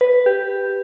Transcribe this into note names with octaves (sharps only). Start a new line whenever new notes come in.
B4
G4